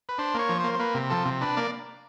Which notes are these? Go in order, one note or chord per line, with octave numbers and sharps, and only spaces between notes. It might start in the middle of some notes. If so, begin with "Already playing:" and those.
B4
D4 C5
A#3 C#5
F3
A#3 C5
C5
A#3 B4
C3
F3 A4
C3
D4 B4
A#3 D5